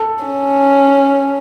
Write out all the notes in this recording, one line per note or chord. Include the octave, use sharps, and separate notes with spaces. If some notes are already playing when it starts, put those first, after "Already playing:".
Already playing: A4
C#4